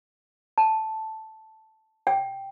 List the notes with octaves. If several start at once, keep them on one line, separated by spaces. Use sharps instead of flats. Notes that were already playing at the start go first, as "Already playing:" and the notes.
A5
G5